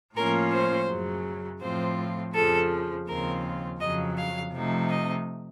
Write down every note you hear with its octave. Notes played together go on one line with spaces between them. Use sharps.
A2 F3 A#3 C#4 F4 A#4
C5
F#2 C#3 F#3
A2 F3 C4 F4 C5
F2 C#3 F3 A4
D#2 C#3 F3 C4 F4 A#4
F2 C#3 F#3 D#5
F5
C3 F3 A3 D#4
D#5